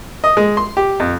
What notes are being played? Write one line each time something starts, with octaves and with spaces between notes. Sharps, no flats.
D#5
G#3
C6
G4
F2